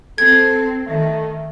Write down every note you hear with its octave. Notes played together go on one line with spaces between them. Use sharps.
C4 A4 G#6
D#3 A3